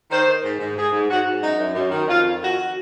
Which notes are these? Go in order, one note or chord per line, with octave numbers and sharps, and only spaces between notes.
D#3 C5
D#3
G#2
G#2
G#2 G#4
G#2
G#2 F#4
G#2
F#2 D#4
F#2
F#2
D#3
F2 F4
D#3
F2 F#4